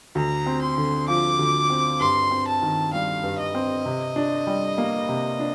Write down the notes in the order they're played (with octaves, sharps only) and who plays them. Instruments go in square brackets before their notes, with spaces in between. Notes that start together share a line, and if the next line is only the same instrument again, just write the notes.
[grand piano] D2 [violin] A#5
[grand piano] C4
[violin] C6
[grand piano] D3
[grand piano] F3 [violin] D6
[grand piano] D2
C4
[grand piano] G2 [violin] C6
[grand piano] C4
[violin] A5
[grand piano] D#3
[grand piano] G3 [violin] F5
[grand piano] G2
[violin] D#5
[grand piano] C4
C3
D4
G3
A#3
C3
D4